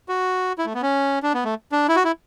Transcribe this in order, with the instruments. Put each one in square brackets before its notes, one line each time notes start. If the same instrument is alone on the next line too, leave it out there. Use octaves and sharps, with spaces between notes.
[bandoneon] F#4
E4
A3
B3
C#4
D4
B3
A3
D4
E4
F#4
E4